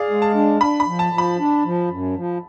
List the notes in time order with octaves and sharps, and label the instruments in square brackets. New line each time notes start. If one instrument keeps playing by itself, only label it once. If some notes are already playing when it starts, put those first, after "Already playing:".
Already playing: [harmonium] G#4 [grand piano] D5 F5
[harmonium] G#3
[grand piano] A5
[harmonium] D4
[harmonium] D4 [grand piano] B5
[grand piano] B5
[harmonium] F3
[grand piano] A5
[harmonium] F3
[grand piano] B5
[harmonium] D4
F3
F#2
F3